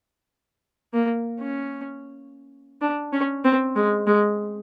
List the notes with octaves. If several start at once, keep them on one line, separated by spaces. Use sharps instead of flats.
A#3
C#4
D4
C#4
C4
G#3
G#3